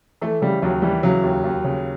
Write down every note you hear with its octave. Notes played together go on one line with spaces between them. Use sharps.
E3 A3
C#3 G3
D#2 F#3
E3 G3
C#3 F#3
D#2
D#2
C#3